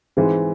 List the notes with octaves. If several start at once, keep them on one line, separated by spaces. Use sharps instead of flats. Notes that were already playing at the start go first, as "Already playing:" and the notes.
G#2 E3 G#3 C4